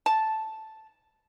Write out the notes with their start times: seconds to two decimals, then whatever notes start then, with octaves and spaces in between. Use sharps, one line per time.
0.06 A5